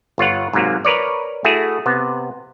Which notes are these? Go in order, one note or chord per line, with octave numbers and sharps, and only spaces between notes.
G1 F4 C#5 F#5
G#2 C3 F#3 A#3
A#4 B4 C#5 D5
A3 E4 F#4 G#4
C3 B3